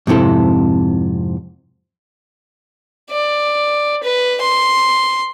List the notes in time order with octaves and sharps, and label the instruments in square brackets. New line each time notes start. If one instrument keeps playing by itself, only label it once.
[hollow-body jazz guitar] F2 G#2 C3 E4 A4
[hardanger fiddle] D5
B4
C6